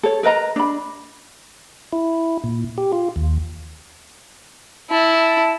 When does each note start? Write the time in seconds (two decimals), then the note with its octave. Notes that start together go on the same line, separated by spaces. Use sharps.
0.03 A4 C#5
0.23 A#4 B4 D#5 A#5
0.56 D4 B5
1.93 E4
2.44 A#2
2.78 G4
2.92 F4
3.16 D#2
4.90 E4 A5